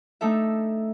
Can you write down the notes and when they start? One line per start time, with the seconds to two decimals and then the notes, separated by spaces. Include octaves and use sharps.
0.21 A3 D4 D#4 A4 E5